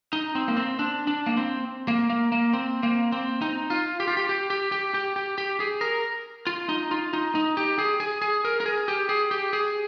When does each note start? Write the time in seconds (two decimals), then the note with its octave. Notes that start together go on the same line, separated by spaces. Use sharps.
0.13 D#4
0.35 C4
0.48 A#3
0.57 C4
0.79 D4
1.07 D4
1.26 A#3
1.37 C4
1.88 A#3
2.10 A#3
2.32 A#3
2.53 C4
2.83 A#3
3.12 C4
3.42 D#4
3.70 F4
4.00 G4
4.07 F4
4.17 G4
4.29 G4
4.50 G4
4.72 G4
4.94 G4
5.16 G4
5.38 G4
5.60 G#4
5.81 A#4
6.47 F4
6.69 D#4
6.91 F4
7.13 D#4
7.35 D#4
7.57 G4
7.79 G#4
8.00 G#4
8.22 G#4
8.45 A#4
8.60 A#4
8.66 G#4
8.88 G4
9.09 G#4
9.31 G4
9.53 G#4